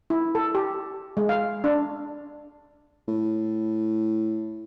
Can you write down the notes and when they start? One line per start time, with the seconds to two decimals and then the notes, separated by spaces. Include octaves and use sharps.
0.10 E4
0.35 A4
0.55 G4
1.17 G#3
1.29 F5
1.64 D4
3.08 A2